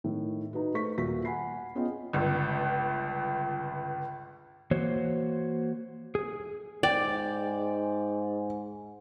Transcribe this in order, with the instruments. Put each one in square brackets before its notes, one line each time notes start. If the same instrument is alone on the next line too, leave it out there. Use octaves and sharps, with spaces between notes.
[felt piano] A2 D#3
D#4 F#4 B4
A3 B4 C5 C#6 B6
D#1 A#2 F#4 E5 B6
F#5 G#5 B5 C7
B3 C#4 F4 G#4 D#5 G5
G1 C#2
[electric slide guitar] E3 A#3 F#4 C5 C#5
G#4
[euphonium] G#2 [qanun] D5 [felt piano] G5